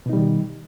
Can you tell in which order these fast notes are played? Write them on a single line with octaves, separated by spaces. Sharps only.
B2 D#4 G3 D#3